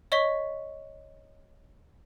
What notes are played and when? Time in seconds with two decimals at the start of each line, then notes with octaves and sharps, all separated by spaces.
0.12 C#5 D#5 C#6 B6 G7